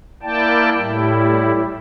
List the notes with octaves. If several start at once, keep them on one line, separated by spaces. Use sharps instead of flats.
A#3 E4 D5 G5 A5
A2 G3 E4